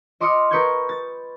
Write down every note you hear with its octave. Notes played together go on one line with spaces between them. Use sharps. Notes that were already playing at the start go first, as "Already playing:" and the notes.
D#5 C6 D6 D#6 F6 C#7
A#4 B4 C#6 D#6 G6 G#6
A6